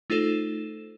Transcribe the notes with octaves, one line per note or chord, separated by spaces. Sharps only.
A3 D#4 F4 A4 C5 E7